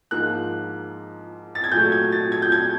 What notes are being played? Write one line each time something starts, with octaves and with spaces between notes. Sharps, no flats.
G#2 F3 A#3 F#6
A6
G#6
A#2 F#3 A3 G6
G#6
A6
G#6
G6
G#6